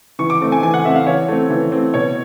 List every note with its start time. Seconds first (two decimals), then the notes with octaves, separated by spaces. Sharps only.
0.19 E3 C#6
0.30 D6
0.41 A3 C4
0.52 G#5
0.63 E3 G#5
0.74 F#5
0.85 A3 C4 E5
0.95 F5
1.06 E3 C#5
1.28 A3 C4
1.50 E3
1.72 A3 C4
1.94 B2 C#5